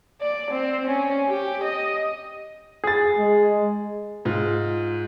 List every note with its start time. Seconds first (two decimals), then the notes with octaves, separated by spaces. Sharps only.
0.21 D5
0.51 C4
0.87 C#4
1.27 G4
1.63 D#5
2.84 G#4 A6
3.18 G#3
4.25 G#2 F4